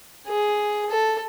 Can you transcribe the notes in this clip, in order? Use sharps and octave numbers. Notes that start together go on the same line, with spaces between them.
G#4
A4